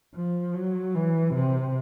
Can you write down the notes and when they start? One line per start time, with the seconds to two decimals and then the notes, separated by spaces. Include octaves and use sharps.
0.16 F3
0.54 F#3
0.95 E3
1.34 C3